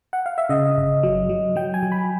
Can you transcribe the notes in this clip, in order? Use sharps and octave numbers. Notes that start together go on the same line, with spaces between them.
F#5
F5
E5
C#3 D#5
G1
F#3
F#3
F#3 G5
G#5
F#3
B5